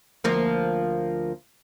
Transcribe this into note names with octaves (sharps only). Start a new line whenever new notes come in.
D2 F3 A#3